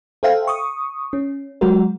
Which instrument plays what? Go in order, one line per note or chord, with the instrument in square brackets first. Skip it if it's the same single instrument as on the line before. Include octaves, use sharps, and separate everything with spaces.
[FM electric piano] A4 C5 E5 F5 G5
C#6 D#6
C#4
F#3 G#3 F#4 A#4